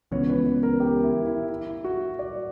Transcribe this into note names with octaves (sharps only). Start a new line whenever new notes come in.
C#2 C#3 E3 B3 C#5
B4
B4
A#4
G4
E4
E4
E4
F#4
D5